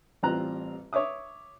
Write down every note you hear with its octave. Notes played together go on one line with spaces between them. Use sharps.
A1 G3 C4 F4 A#5 F#6
C#5 E5 D6 D#6